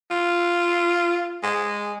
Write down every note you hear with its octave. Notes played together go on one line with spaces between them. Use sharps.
F4
G#3